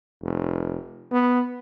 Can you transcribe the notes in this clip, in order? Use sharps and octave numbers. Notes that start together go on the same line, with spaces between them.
F1
B3